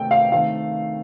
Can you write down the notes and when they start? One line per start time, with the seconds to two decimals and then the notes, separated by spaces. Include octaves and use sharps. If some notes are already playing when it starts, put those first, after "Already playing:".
Already playing: C3 D#3 A3 D#4 G4 G5
0.11 F5
0.32 D#3 A3 C4 F5